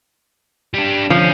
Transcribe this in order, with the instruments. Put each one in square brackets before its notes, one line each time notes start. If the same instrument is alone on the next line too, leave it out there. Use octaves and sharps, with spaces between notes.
[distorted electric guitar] G3 D4
[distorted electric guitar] D3 C#4 [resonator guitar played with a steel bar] F3